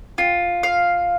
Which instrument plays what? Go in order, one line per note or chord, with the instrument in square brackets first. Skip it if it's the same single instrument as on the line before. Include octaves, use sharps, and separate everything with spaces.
[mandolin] F4
F5